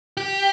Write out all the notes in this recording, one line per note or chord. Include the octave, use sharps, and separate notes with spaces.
G4